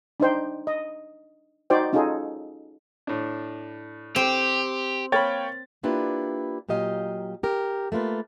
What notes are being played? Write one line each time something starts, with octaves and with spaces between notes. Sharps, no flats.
D4 D#4 C5 G5
D#5
D#4 F#4 C5 D5 G5
C#4 D#4 F4 F#4 G#4 A4
A2 D4
C4 G4
A#3 A#4 C#5 G5 B5 A6
A#3 D4 E4 F4 G4 B4
A#2 F#3 G4 D#5 F5
G4 A#4
A3 A#3 F4 B4